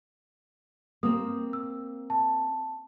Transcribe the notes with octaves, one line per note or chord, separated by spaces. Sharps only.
A#3 C4 D#6
E6
A5